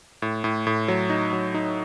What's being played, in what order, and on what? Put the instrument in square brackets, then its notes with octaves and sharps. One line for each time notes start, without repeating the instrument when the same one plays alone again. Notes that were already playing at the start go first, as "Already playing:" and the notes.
[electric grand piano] A2
A2
A2
F#3
D#4
F#3
D#4